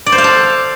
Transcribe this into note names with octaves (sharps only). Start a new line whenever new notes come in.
D5
C5
F5
A4